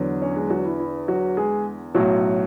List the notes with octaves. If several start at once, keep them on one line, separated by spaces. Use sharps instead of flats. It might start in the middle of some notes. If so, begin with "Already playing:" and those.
Already playing: E2 D3 F#3
C#4 C#5
G#3 G#4
F#3 F#4
E4
E4
F#3 F#4
G#3 G#4
B1 A2 F#3 F#4